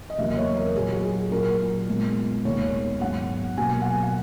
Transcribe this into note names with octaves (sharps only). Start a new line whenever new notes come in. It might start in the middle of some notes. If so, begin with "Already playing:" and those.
D#5
E2 C#3 F#3 A#3 E5
D#5
C#5
A#4
A#2 F#3 A#3 G#4
F#4
G#4
A#2 F#3 A#3 A#4
A#2 G#3 B3
D#2 D#3 G#3 B3 C#5
C#5
G#2 F#3 B3 F#5
B2 F#3 A#3 G#5
F#5
G#5
F#5